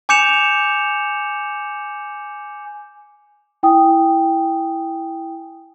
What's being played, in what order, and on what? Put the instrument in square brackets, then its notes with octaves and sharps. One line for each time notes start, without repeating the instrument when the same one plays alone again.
[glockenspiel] G#5 D6 G6 C#7 E7 F7
[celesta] E4 G5 G#5 D#6